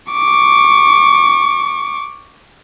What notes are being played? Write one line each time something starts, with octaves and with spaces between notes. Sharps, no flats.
C#6 D6